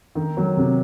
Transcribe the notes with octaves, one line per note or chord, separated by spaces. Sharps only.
D#3
F#3
C3